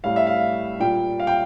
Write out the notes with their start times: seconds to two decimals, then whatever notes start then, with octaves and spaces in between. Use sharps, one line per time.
0.04 A2 G3 F5
0.16 E5
0.27 F5
0.80 A#2 G3 G5
1.19 F5
1.27 G5